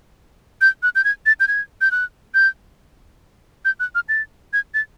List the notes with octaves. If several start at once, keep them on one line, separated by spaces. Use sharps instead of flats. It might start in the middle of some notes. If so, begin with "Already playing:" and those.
G6
F#6
G6
G#6
A6
G6
G#6
G6
F#6
G6
G6
F#6
F6
A6
G#6
A6